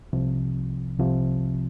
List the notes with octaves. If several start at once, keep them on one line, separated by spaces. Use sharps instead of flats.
C2 C3 F3
C2 C3 F3